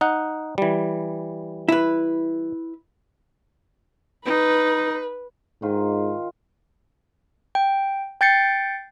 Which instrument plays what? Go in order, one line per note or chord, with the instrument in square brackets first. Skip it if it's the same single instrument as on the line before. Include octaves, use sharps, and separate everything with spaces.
[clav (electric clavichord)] D#4 F#5
E3 G3
[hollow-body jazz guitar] E4 B4
[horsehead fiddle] D#4 [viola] B4
[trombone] G#2 [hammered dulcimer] D#3 F4
[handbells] G5
G5 G6 A6 C7 C#7